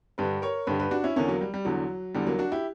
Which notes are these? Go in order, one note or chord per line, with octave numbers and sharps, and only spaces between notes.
G2 D3 G4 B4
A#4 C#5
G2 D3 G4 B4
G4 B4
D4 F#4
C#4 E4
E2 D3 A#3 C#4
F#3 A#3
G3
G3
E2 D3 F#3
E2 D3 G3
F#3 A#3
D4 F#4
E4 G4